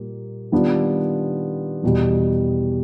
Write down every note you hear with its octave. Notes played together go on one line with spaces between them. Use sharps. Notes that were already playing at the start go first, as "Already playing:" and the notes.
Already playing: A#2 G3 A#3
D#3 G3 B3 D4 F4
E2 B2 G3